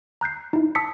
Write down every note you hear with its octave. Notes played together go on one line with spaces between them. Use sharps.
A#5 F#6 G6 C7
D#4 E4
A5 D#6 E6 B6 C#7